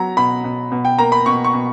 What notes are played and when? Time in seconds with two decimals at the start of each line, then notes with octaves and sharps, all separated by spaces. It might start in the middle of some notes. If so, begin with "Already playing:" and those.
Already playing: F#3 B3 A#5
0.17 B2 B5
0.44 B2
0.72 B2
0.85 G5
0.99 A#3 A#5
1.12 B5
1.26 B2 C#6
1.44 C#6
1.53 B2